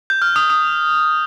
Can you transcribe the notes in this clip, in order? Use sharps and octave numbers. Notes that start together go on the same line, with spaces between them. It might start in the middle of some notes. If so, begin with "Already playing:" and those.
G6
F6
D#6
D#6